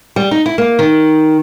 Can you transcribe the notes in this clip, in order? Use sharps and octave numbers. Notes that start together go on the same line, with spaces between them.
G3
D#4
E4
A#3
D#3